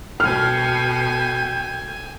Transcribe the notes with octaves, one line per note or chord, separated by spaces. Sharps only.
B2 A4 G5 G#5 F6